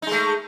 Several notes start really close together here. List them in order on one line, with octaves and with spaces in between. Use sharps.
D#4 G#3 A3